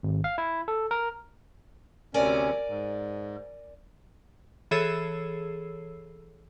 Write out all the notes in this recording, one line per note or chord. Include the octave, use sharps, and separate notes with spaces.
G#1
F5
E4
A4
A#4
D2 C3 C#4 A#4 D5 G#5
G#2
E3 G#4 A4 C#5 E6 C7